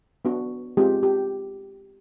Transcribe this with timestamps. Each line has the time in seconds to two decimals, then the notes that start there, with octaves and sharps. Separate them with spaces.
0.25 B3 D4 F#4
0.77 G#3 C4 F4 G4
1.03 G4